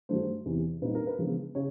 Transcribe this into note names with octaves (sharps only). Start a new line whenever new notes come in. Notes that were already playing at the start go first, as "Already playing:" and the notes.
G2 D#3 F#3 A3 D4 C5
E2 C3 E3
A#2 G3 C4 D#4 B4
A#4
B4
C#3 F3 G#3 B3 D4
C#3 C#5